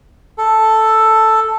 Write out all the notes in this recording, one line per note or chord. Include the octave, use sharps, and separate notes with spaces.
A4